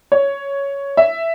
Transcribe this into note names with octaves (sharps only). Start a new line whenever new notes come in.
C#5
E5